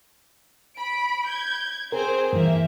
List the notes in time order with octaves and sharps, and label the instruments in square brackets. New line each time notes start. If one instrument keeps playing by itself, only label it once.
[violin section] B5 D7
G6 G#6
[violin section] C4 G#4 C5 [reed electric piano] A#4
[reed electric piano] G2 E3 [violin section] A#3 E5